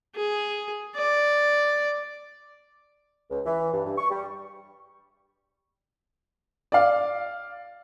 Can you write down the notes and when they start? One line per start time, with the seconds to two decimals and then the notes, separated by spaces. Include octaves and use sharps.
0.15 G#4
0.96 D5
3.30 C#2
3.45 E3
3.72 G2
3.85 G2
3.98 C#6
4.10 G3
6.72 D5 F5